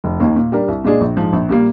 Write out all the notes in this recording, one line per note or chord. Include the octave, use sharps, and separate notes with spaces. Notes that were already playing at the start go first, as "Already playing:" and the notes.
F1
D#2 D#3 A#3
A#2
G3 D4 G4 A#4
C2
A#2 G#3 D4 G#4
A#1
G#2 F3 G#3
A#1
A#2 G3 A#3